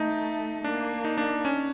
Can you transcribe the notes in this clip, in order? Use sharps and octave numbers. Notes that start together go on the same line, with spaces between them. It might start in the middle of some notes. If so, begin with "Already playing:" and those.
Already playing: A3 D#4
A#3 D4
D#4
D4
C#4